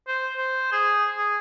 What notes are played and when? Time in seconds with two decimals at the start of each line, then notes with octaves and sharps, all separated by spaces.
0.08 C5
0.37 C5
0.72 G#4
1.17 G#4